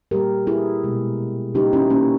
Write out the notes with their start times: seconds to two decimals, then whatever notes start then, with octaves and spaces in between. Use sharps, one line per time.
0.11 A#2 G3 A#3 G4 A#4
0.47 E4 G#4
0.84 B2 G#3
1.54 C#3 G3 A#3 D#4 G4
1.73 C#4 E4
1.90 A#3 C#4